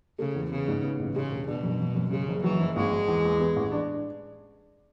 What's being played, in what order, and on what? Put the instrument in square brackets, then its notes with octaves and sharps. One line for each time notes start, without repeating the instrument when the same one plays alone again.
[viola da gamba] C#3 [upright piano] A3
[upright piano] E2
[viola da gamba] C#3 [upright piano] B3
[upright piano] G#2
B3
A1
[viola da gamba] C#3 [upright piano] G#3
[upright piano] E1
[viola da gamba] B2 [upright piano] D4
[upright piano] F#2
F#2
F#2
[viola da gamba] C#3 [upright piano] G#3
[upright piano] F#1
[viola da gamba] E3 [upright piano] F#3
[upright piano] F#1
[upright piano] G#1 [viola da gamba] G#3
[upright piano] G#1
E2
E2
B3
A1
D4